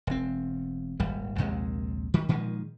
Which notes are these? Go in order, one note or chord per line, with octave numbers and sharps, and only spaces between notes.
E1 C4
D#1 G#1 G3
A#1 D#2 C3 G#3
D#3 G3
A#2 D#3 F3 G#3